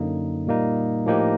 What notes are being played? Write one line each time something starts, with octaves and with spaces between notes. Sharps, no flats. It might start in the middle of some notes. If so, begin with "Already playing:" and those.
Already playing: F#2 D3 F#3 A#3 D#4
A#2 G3 A#3 D#4
A2 F3 A#3 D#4 G4